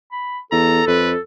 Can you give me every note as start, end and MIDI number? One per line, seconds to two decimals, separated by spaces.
0.12 0.39 83
0.52 0.82 40
0.52 1.20 69
0.52 0.84 82
0.87 1.14 41
0.87 1.12 71